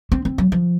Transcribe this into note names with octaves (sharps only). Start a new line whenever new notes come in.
C4
C4
F#3
F3